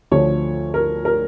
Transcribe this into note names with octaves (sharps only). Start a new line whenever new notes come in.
D2 D3 F3 A3 C#5
A#4
A#4